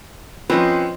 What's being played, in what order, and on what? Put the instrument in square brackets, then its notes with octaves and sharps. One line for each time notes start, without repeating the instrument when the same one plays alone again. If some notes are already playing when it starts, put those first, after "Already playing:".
[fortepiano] F3 [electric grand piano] C4 C#4 B4 [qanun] C5 D#5